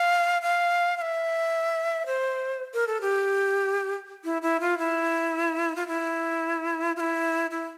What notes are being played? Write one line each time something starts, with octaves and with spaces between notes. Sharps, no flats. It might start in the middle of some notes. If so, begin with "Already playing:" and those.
Already playing: F5
F5
F5
E5
C5
A#4
A4
G4
E4
E4
F4
E4
F4
E4
F4
E4
E4